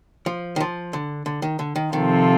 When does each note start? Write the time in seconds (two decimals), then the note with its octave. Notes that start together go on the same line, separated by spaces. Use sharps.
0.26 F3
0.56 D#3
0.60 F3
0.93 D3
1.26 D3
1.42 D#3
1.59 D3
1.76 D#3
1.93 C3 D#3 F3 C4 F4 A4